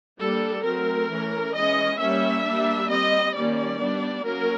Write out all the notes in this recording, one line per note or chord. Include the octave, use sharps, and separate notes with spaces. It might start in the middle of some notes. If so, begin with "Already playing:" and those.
G3 A#3 D4 A4
F#3 A3 C4 A#4
E3 A3 C#4
E3 G#3 C#4 D#5
G3 A#3 C#4 E5
G3 A#3 D4
G3 C4 D#5
D#3 G3 A#3 C#4 D5
G3 B3 D4
F#3 A#3 C#4 A#4